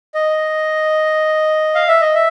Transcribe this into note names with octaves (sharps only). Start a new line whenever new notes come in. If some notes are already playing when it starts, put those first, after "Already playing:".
D#5
F5
E5
D#5
E5